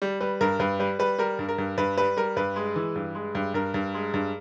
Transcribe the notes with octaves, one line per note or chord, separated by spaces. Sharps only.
G3
G3 B4
G2 A#4
G2 B4
G3 B4
G3 B4
G3 A#4
G2
A#4
G2
G2 B4
G3 B4
G3 A#4
G2 B4
G#3
E3
G2
G#3
G2
G2 A#4
G2
G#3
G2